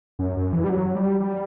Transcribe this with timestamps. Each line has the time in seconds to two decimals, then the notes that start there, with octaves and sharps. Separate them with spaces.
0.19 F#2
0.37 F#2
0.53 E3
0.64 G3
0.69 F#3
0.95 G3
1.20 G3